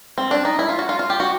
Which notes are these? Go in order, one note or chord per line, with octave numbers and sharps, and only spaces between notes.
C4
D4
D#4
E4
F4
F#4
F4
F4
G4
F#4